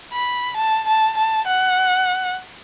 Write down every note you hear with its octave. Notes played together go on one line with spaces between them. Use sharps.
B5
A5
A5
A5
F#5